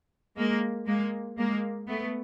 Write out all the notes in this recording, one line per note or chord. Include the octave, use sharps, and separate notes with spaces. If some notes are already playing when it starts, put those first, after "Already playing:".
G#3 A#3
G#3 A#3
G#3 A#3
A3 B3